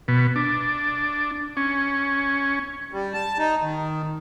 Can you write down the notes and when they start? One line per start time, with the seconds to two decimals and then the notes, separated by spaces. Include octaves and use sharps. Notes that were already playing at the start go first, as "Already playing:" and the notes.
0.08 B2
0.36 D4
1.57 C#4
2.93 G3
3.13 A5
3.39 D#4
3.62 D#3